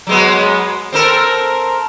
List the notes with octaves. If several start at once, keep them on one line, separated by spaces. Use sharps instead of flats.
F#3 G#3 B3
C4 A4 A#4